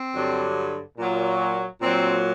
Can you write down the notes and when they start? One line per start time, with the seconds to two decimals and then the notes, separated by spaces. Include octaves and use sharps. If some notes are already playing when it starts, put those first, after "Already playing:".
Already playing: C4
0.14 G2 D3 F#3
0.98 A#2 F#3
1.81 A#2 F#3 C4